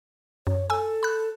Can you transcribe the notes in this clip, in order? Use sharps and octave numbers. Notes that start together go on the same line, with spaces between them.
F#2 C#5
A4 G#5 E6
B5 F#6